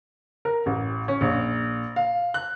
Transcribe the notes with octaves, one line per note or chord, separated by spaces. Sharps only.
A#4
A1
C#4
A#1
F5
F#6